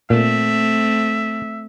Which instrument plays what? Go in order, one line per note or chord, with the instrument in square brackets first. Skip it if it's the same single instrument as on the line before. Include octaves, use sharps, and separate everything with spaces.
[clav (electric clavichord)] A#2 [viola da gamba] A3 C4 [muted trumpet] E5